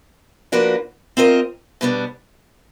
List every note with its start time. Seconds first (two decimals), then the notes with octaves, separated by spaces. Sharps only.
0.52 F3 A#3 D4 F#4 B4
1.17 C4 F4 A#4 D#5
1.81 B2 G3 B3 D4